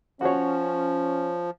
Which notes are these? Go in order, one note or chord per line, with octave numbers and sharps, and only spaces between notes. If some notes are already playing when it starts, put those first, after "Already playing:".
F3 C#4 F#4 C#5